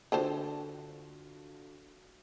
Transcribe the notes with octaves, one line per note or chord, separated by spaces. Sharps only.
D3 D4 F4 F#4 A4 C5